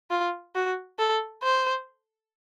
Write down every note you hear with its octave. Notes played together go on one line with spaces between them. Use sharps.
F4
F#4
A4
C5